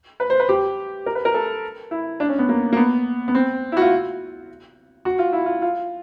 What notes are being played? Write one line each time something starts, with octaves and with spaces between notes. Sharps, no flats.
B4
C5
B4
G4
A#4
B4
A#4
A4
E4
D4
C#4
B3
A#3
A#3
B3
B3
C4
E4
F#4
F4
F#4
F4
E4
F4
F4